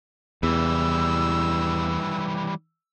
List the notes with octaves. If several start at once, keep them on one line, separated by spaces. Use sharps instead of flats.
E2 E3 G3 E6